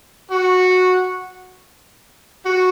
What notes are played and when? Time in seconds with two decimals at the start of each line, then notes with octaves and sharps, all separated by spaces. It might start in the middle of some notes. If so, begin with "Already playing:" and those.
0.31 F#4
2.46 F#4